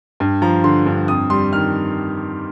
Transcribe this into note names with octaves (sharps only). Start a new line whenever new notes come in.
G2
F3 A#5
D3 C6
G2
F2 D#6
G3 C6
D#3 F6